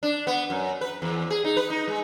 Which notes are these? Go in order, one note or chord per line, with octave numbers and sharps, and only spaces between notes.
D4
B3
F#2
B4
E2
G#4
D#4
B4
D#4
G#3